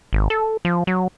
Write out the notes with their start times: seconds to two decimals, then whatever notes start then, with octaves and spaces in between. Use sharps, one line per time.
0.13 G#1
0.30 A4
0.65 F3
0.87 F#3